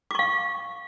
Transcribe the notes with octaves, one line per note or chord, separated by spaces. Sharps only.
F5 C#6 D6